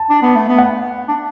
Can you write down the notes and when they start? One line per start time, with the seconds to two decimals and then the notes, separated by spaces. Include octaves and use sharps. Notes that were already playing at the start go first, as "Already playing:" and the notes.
Already playing: A5
0.10 D4
0.22 B3
0.35 A3
0.48 B3
0.58 F#5
1.08 D4